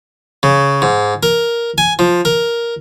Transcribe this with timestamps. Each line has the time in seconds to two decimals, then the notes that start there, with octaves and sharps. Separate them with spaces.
0.43 C#3
0.82 G#2
1.23 A#4
1.78 G#5
1.99 F3
2.25 A#4